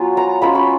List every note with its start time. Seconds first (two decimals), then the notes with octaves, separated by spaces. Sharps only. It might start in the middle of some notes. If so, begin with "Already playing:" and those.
Already playing: F#3 B3 F4 G#5
0.17 A#5
0.42 G#3 C#4 F4 B5
0.55 C#6